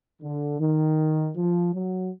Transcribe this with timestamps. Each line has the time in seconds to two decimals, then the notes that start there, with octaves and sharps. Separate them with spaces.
0.21 D3
0.59 D#3
1.36 F3
1.74 F#3